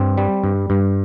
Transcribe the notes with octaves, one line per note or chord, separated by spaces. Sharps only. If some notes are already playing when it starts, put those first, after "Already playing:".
Already playing: G2 C4
G3
G2
G2